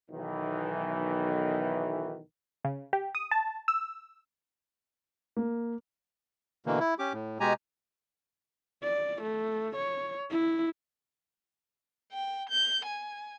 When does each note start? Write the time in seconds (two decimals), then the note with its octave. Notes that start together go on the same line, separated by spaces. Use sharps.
0.11 B1 D#3 E3
2.64 C#3
2.93 G4
3.15 D#6
3.31 A5
3.68 E6
5.37 A#3
6.66 B2 D3 E3 A#3
6.80 E4
6.99 C#4 G4 D6
7.13 A2
7.40 B2 G#3 G4 G#5 A#5
8.84 D5
9.23 A3
9.77 C#5
10.30 E4
12.12 G5
12.50 G6
12.85 G#5